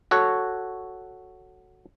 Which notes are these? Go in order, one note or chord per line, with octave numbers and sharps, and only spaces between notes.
F#4 A4 C#5 F#5